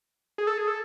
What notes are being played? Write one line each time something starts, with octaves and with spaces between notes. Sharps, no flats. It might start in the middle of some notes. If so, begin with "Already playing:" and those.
G#4
A4
G#4
A4